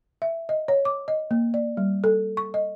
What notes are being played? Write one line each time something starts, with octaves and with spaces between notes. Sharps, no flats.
E5
D#5
C#5
D6
D#5
A#3
D5
G3
A4
C#6
D#5